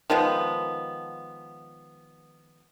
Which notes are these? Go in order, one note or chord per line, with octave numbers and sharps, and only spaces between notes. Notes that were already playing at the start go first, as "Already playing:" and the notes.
D#3 F3 G#3 B3